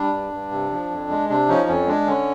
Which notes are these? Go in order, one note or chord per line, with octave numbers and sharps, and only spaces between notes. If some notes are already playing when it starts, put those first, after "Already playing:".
Already playing: G3 D4
G2
G2
C3
F3
F2
G#3
C3 D4
F3 C#4 D#4
F2 C#4
G#3 D4
D3 C#4